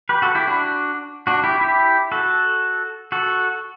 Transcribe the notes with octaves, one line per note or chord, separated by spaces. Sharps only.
G4 B4
F#4 A4
E4 G4
D4 F#4
D4 F#4
E4 G4
E4 G4
F#4 A4
F#4 A4